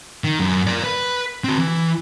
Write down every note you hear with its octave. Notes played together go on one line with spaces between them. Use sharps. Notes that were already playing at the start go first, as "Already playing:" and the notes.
D#3
F#2
A#4 D5
B4 B5
C4 F#4
E3